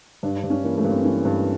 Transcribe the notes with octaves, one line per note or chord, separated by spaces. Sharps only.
G2 D4
D4
G2
C#4
E3 A#3
A3
G2
C4
E3 C#4
G2